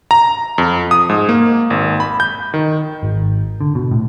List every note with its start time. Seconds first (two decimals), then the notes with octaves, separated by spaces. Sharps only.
0.11 A#5
0.58 F2
0.91 D#6
1.09 G#2
1.29 A#3
1.70 G#1
2.00 B5
2.20 G6
2.54 D#3
3.03 G#1
3.61 D3
3.75 B2
3.91 A2